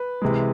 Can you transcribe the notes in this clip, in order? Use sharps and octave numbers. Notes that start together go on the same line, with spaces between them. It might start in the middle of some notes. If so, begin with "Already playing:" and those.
Already playing: B4
C3 E3 G#3